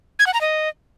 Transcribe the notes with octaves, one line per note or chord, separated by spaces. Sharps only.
G#6
F#5
A#5
D#5